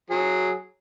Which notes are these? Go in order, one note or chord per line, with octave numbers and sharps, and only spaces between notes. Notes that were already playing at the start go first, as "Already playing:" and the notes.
F#3 G#4